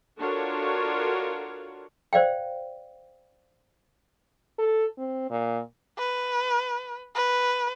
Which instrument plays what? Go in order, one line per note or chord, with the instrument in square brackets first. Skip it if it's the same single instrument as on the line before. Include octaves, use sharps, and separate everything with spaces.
[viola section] D4 F4 F#4 A4 A#4 C#5
[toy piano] C5 D5 F5 G5
[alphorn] A4
C4
A#2
[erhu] B4
B4